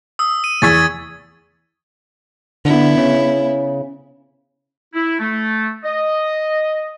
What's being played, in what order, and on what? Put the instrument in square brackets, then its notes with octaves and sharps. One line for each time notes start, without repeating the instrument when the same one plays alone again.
[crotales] D#6 E6
D#7
[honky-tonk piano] E2 C#6 B6 [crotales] E6 G#6 A6
[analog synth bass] D3 [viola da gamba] B3 E4
[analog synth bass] C#3
[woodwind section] E4
A3
D#5